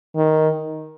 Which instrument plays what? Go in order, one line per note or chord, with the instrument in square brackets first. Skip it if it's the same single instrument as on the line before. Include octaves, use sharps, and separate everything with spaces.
[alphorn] D#3